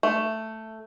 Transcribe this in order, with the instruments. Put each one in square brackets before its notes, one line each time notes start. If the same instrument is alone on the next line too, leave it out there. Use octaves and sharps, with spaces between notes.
[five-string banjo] A3